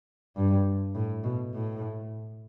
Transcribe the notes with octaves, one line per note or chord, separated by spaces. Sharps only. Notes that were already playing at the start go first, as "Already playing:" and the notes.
G2
A2
B2
A2